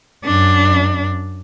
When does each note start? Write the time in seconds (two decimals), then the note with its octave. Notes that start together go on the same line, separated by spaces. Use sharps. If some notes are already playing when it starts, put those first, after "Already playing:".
0.25 F#2 D4